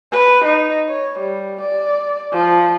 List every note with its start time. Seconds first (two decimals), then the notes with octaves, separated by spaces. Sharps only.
0.12 B4
0.45 D#4
0.89 C#5
1.19 G3
1.61 D5
2.33 F3